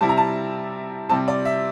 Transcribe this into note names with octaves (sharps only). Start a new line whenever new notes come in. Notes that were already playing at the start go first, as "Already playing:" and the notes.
C3 G3 C4 E4 A5
A#5
A5
C3 G3 C4 A5
D5
E5